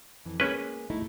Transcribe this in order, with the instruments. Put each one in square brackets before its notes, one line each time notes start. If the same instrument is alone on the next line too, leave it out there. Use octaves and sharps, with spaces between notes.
[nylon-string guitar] F2 E3
[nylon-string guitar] G#3 A#3 [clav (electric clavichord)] C#4 B4
[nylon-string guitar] A3 D#4 E4